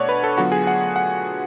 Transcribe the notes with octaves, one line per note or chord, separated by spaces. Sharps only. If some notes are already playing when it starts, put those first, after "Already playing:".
Already playing: B2 A3 D4 C#5 D5 F#5
B4
A4
D3 F#3 B3 F4 F#4
G#4
F#5
F#5